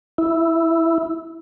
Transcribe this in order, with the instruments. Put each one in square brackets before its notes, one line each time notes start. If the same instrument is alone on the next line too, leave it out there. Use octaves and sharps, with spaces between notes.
[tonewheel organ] E4